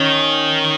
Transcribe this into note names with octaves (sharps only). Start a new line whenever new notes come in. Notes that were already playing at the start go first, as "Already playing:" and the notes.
Already playing: D#3 C#4